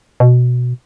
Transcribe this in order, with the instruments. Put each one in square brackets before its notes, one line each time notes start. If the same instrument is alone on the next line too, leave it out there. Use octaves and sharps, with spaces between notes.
[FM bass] B2